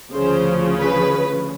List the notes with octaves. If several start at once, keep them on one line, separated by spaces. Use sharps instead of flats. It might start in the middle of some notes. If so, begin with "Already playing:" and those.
D2 C#3 F3 C5
B4